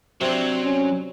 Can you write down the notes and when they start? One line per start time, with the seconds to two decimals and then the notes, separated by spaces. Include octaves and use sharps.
0.21 C3 F#3 C4 D4
0.64 C#4